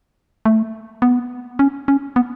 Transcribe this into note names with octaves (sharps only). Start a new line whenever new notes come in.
A3
B3
C#4
C#4
B3